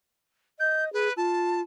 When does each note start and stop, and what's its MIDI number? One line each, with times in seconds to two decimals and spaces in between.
0.59 0.91 75
0.59 0.84 91
0.93 1.09 68
0.93 1.13 71
1.16 1.62 65
1.16 1.60 81